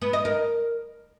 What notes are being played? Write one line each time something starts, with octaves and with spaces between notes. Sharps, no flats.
B3
D#5
A#4